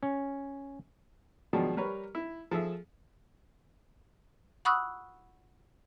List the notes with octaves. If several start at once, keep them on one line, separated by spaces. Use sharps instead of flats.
C#4
B2 D#3 F3 F#3 G#3 D4
G3 A#4 B4 C#5
E4
F3 G#4 A4 E5
F#5 B5 C#6 D#6 E6 F#6